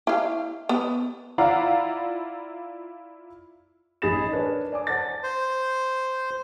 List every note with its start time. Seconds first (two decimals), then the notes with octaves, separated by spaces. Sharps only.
0.07 E4 F5
0.69 B3
1.38 E4 F4 D5 F5 F#5 A#5
4.02 A1 D#4 G#4 B5 A6 E7
4.32 D4 A#4 B4 C#5
4.72 D5 G#5 D6
4.87 C5 F#5 A5 A6
5.23 C5